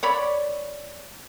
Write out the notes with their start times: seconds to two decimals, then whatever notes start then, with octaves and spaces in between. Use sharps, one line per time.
0.03 C#5 D5 B5